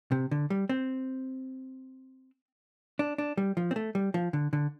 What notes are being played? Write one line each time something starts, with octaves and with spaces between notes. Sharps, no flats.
C3
D3
G3
C4
D4
D4
G3
F3
C4
A3
G3
F3
D3
D3